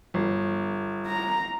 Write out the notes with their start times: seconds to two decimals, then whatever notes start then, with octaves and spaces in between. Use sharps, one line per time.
0.14 G1
1.07 A#5